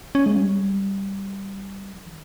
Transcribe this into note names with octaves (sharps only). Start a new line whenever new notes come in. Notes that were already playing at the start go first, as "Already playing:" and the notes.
C#4
G#3
G3
F3
D#3